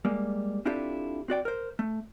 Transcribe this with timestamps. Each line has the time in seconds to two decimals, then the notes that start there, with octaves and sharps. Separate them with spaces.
0.05 G3 G#3 A#3
0.65 C4 D4 E4 F4 G4 A4
1.28 C4 F#4 D5 G5
1.45 A#4 C5
1.79 A3